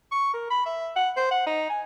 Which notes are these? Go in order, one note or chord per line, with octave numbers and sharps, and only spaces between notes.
C#6
A#4
B5
E5
F#5
C5
F#5
D#4
G#5